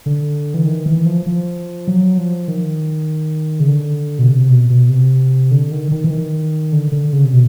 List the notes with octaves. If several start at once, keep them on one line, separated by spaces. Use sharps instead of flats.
D3
E3
D#3
E3
F3
F3
F#3
F3
D#3
C#3
D3
B2
C3
B2
B2
C3
D3
D#3
D#3
E3
D#3
D3
D3
C#3
C3
B2